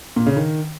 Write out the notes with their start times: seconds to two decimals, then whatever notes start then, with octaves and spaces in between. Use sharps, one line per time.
0.16 A#2
0.26 C#3
0.36 D#3